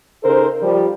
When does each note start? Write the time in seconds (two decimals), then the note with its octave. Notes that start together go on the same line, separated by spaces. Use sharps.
0.23 C#3 D#4 A4 A#4 C5
0.62 F3 G3